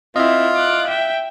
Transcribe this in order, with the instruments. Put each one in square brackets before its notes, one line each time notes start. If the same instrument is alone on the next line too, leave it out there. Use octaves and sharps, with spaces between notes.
[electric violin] C4 E4 [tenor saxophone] F4 [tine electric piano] D#5 E5
[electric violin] D6 F#6
E5 G5